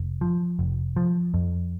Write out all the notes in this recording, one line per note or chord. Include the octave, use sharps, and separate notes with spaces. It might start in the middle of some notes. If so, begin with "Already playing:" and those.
Already playing: F1
F3
F1
F3
F2